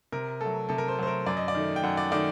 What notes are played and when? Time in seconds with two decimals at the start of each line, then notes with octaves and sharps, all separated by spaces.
0.12 C3 A#4
0.41 F#3 A3 A4
0.69 C3 A4
0.78 A#4
0.88 C5
0.98 F#3 A3 C5
1.07 A#4
1.26 F#2 D5
1.37 D#5
1.48 D5
1.54 D#3 A3
1.76 G5
1.83 F#2 F#5
1.97 D5
2.11 D#3 A3 D5